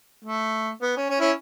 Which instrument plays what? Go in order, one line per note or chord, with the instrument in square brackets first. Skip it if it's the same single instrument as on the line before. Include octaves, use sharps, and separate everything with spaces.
[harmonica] A3
B3
C#4
C#4
C#4 E4